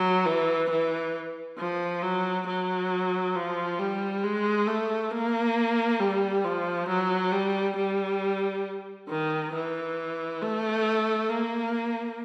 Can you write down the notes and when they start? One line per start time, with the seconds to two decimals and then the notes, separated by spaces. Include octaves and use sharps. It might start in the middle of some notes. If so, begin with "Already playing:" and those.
Already playing: F#3
0.26 E3
0.70 E3
1.58 F3
2.03 F#3
2.47 F#3
3.36 F3
3.79 G3
4.24 G#3
4.68 A3
5.11 A#3
6.00 G3
6.44 F3
6.89 F#3
7.32 G3
7.77 G3
9.09 D#3
9.53 E3
10.42 A3
11.30 A#3